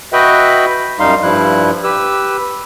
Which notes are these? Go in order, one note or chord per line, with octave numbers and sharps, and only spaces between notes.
F#4 B4 D#5 E5 G5 F#6
F#2 G3 D#4 F5 C6
G2 F3 G3 E4 F#6
G4 B4 E6